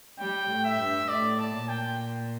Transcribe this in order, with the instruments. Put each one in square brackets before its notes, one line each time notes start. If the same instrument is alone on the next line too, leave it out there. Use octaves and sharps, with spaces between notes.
[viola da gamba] G3 [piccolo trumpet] G5
[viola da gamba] A2
[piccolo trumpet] E5
[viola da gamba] G2
[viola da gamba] A2 [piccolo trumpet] D5
[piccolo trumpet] A5
[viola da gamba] A#2
[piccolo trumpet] G5